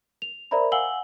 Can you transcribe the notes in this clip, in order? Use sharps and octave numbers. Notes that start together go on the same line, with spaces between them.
F7
A#4 C5 D5 E5 A#5 B5
F5 F#5 G#5 E6 F#7 G7